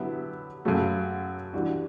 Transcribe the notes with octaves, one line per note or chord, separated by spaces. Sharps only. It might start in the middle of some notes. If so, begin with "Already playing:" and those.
Already playing: D3 F#3 B3 E4 G4
F#2 C#3 F#3 A3
G2 E3 G3 D4 F#4